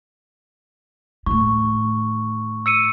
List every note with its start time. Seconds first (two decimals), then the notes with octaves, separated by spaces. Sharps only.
1.26 A2 D#3 C#6
2.66 E6 C#7 D#7